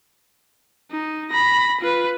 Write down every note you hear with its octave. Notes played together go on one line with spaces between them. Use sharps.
D#4
B5 A#6
F4 B4